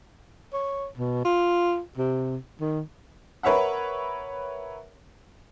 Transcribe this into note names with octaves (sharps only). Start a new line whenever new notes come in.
C#5
B2
F4
C3
D#3
A#4 B4 C#5 E5 F#5